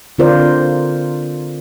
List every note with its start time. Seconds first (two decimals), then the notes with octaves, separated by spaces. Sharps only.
0.18 D3 C4 F4 A#4 C5 D5